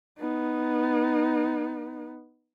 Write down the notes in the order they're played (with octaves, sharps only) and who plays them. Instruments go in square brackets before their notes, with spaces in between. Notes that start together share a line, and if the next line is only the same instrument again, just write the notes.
[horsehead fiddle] B3 D#4